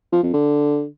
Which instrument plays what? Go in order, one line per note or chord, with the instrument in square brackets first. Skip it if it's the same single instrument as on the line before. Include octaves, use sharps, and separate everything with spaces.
[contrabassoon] F3
F2
D3